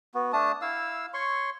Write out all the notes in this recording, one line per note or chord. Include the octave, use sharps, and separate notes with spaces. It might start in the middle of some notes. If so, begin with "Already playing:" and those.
B3 F#4
A3 D4 A5 D#6
E4 F5 E6
C#5 C6 C#6